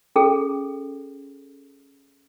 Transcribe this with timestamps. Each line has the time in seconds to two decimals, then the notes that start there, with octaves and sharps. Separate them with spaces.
0.16 C#4 G#4 A4